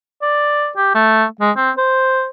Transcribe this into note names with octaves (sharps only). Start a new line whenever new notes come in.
D5
G4
A3
G#3
C4
C5